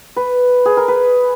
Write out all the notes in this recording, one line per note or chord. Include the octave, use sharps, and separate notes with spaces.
B4
G#4
A#4
B4